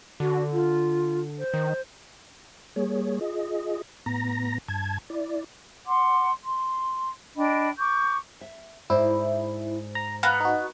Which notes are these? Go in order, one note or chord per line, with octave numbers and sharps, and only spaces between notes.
D3 F#4
F4
C5
D#3
G3 A#3 G#4 C#5
F4 G#4 D#5
A2 B3 A#5 A#6
G2 A5 G#6
E4 D5
F#5 C6 D6
C6
D4 D#5 G5 B5
C#6 D6 G6
E5
G#2 E4 C5 D5
A#5
B3 F5 F#5 A#5
D#4 F#4